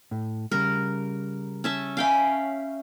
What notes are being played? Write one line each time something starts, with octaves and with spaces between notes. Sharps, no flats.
A2
C#3 G3 A#4
C#4 E5 A5
C#4 E5 F5 G5 B5